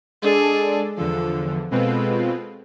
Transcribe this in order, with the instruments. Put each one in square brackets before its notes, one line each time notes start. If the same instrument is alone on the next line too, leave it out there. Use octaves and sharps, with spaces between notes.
[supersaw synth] G#3 D4 A4 D5 [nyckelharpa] G#4
[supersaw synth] E2 D3 F3 [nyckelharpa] A4
[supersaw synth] B2 G#3 C4 F4 B4 [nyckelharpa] A4